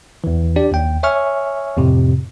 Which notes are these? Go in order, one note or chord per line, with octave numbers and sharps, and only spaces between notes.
E2 E3
D4 G4 D5
D#2 G5
C#5 E5 G#5 C#6 F6
F2 A2 C3